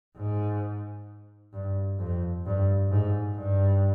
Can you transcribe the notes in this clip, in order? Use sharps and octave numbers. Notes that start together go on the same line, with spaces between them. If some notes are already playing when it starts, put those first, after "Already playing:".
G#2
G2
F2
G2
G#2
G2